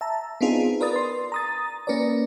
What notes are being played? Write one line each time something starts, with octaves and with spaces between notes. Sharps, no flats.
E5 A5 A#5
B3 C4 D4 D#4 F4 G#4
A#4 B4 D5 D#6 A6
C6
A#5 D#6 A6
A#3 C#4 A#4 B4 D5